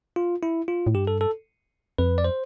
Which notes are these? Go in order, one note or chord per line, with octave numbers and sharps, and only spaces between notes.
F4
E4
F4
A2
G2 G4
A4
A4
F2 B4
D5
C5